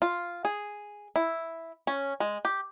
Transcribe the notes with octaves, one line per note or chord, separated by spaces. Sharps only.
F4
G#4
E4
C#4
G#3
G4